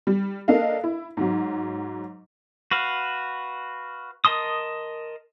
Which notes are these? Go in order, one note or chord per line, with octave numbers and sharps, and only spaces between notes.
G3
A#3 D4 A4 A#4 D#5 F5
E4
G#2 F#3
F#4 B4 F5
A#4 D#5 A5 C6 D#6